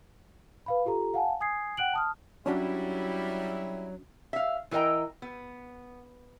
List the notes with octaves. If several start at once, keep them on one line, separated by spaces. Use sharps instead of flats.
B4 F5 B5
F4 G4 A4 A#5
F5 F#5 G#5 A5
G#5 D#6 G#6 C7
F#5 G5 F#6 D7 F#7
A5 D#6 F6
F#3 G3 C#4 D4 E4 F#4
E5 F5
E3 E4 A#4 D#5 G5 A#5
B3